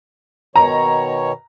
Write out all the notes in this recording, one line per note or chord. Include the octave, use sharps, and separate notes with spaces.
B2 D#3 C#5 A#5